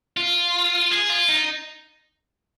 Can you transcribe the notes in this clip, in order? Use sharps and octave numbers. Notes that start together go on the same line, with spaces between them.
F4
G#4
F4
D#4